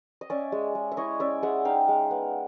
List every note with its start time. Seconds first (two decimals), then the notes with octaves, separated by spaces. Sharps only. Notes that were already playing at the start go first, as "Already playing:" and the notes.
0.21 D#5
0.30 C#4 D5 E5
0.52 G#3
0.75 G#3
0.92 E5
0.97 E4 C#5 D#5
1.20 C#4 D5 E5
1.43 G#3 E5 F#5
1.65 D#4 F5 G5
1.88 G#3
2.11 B3